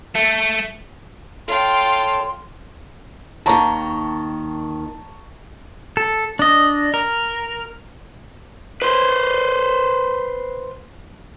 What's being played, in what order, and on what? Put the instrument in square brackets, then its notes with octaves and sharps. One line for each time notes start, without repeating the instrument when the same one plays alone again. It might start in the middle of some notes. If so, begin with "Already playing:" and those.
[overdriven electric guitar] A3
[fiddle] F4 G5 [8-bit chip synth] A4 C#5 A5 [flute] C6
[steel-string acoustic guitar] D#2 D#3 [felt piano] A5 A#5 C#6
[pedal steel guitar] A4
D4 D#5
A#4
[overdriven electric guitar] B4 C5